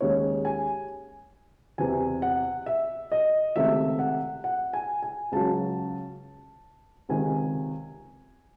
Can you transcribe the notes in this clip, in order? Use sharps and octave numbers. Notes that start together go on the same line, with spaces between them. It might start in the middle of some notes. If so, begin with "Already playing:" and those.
D#2 D#3 G#3 C#4 C#5
G#5
E2 C3 E3 C4 G#5
F#5
E5
D#5
C#2 C3 D#3 A3 E5
F#5
F#5
G#5
G#5
C#2 C#3 F#3 A5
C#2 C3 D#3 G#5